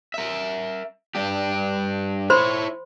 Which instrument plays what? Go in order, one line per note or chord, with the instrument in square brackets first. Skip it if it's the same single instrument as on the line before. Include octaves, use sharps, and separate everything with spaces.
[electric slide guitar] A#4 E5
G2 D4 G4
[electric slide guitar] E4 C#5 [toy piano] C5 B5 C6